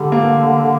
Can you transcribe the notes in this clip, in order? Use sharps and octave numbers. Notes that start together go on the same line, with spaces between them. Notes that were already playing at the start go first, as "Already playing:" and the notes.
Already playing: D3 G3
A#3